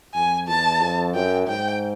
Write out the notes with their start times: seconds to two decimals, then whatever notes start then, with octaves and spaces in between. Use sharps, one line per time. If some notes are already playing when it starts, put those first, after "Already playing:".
0.14 F2 G#5
0.48 E2 A5
0.80 F2
1.14 F#2 G5
1.48 G#2 G5